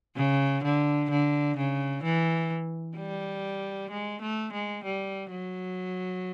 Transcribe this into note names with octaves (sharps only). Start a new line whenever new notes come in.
C#3
D3
D3
C#3
E3
G3
G#3
A3
G#3
G3
F#3